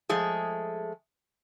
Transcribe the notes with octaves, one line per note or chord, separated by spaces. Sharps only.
F3 G#3 A3 G#4